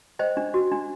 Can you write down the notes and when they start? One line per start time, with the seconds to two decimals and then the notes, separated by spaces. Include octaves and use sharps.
0.19 C5 D#5 G5
0.37 D4
0.54 F#4
0.71 D4